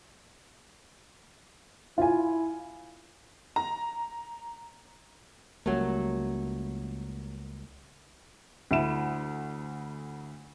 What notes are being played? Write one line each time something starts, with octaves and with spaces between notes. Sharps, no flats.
E4 F4 G#5
A#5
C#2 F#3 G3 A3 A#3
D2 E4 E7